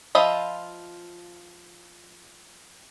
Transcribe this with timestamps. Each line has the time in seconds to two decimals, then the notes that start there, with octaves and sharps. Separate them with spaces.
0.15 F3 F4 D#5 E5 B5